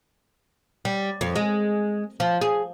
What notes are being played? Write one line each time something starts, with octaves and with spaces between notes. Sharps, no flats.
G3
F2
G#3
F3
G#4